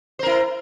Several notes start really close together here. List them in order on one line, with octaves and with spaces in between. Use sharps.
C5 A#4 E4